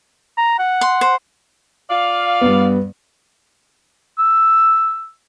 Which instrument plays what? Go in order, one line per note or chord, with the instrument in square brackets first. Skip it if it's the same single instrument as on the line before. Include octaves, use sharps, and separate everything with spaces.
[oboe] A#5
F#5
[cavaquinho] C6
C5
[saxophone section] F4 D5 F5
[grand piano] G2 B3
[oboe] E6